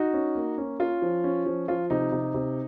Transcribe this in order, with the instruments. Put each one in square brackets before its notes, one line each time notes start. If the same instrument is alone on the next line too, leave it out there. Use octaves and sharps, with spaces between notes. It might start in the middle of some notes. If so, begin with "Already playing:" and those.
Already playing: [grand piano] D#4 F#4
C#4
A#3
C#4
C#4 F4
F3
C#4
F3
F3 F4
C3 D#4
C3
C3